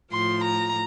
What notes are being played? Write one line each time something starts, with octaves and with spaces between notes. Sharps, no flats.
A2 F3 C6
A#5